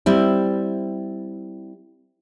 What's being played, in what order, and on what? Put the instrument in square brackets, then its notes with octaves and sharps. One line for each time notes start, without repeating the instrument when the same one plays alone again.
[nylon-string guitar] G3 C4 E4